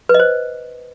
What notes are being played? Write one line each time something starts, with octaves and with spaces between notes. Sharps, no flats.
B4
D#5
C5